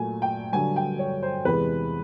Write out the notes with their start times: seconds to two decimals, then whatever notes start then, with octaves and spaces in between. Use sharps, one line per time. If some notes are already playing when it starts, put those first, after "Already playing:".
Already playing: A#2 F#3 A3 G#5
0.22 G5
0.53 G2 D3 F#3 G#5
0.76 G5
0.99 C#5
1.23 C5
1.45 E2 C3 E3 G#3 B4